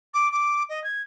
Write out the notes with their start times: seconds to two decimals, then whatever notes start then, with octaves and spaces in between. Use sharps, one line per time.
0.14 D6
0.32 D6
0.69 D#5
0.84 G#6